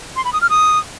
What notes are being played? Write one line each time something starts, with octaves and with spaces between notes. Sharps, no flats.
C6
B5
D#6
F6
D#6